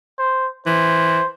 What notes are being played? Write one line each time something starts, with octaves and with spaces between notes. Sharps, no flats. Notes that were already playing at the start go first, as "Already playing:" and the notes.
C5
E3 C5